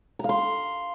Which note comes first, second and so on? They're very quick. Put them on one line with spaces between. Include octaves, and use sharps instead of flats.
A#5 F5 C6